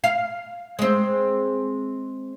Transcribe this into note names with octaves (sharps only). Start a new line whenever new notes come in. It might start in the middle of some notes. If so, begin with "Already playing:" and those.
F5
G#3 C4